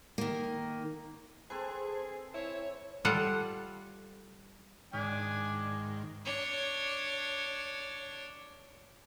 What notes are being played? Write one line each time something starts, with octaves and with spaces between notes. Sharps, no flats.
D#3 A#3
C4 G#4 A4 B4 C5
E4 C#5
G3 F4 A4 F#5
G#2 D#3 D4 G#5
D4 C#5